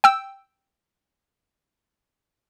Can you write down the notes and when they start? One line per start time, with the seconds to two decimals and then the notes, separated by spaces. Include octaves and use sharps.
0.04 G5 E6